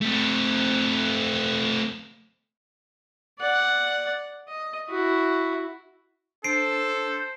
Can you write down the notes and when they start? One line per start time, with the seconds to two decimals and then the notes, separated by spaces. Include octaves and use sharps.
0.01 A3 C4
3.40 D5 F#5
4.49 D#5
4.89 E4 F#4
6.44 D4 A4 C5 C7 D7